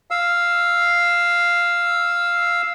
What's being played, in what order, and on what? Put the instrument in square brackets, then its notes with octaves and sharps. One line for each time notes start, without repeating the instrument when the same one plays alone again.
[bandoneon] F5 E6